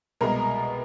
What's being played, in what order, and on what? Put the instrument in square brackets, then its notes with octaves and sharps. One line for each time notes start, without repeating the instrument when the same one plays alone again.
[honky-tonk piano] C2 B2 G#3 B3 A#4 A#5